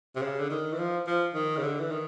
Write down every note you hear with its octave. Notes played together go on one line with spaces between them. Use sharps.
C3
C#3
D3
D#3
E3
F3
F3
D#3
C#3
D3
E3
D#3